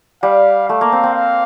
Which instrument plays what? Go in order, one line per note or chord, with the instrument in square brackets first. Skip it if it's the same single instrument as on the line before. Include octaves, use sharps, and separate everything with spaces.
[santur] G3 [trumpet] F5
[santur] A3 [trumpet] F5
[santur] A#3
C4
C4
[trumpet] F5